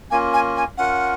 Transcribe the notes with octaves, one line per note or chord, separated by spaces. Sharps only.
A#3 C#4 F4 G#5
G#5
G#5
C#4 F4 A#4 F#5